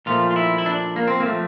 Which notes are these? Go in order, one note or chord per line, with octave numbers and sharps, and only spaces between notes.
A#2 F3 A3 F4
F4
E4
E4
D4
A#3
C4
A#3
F3 A3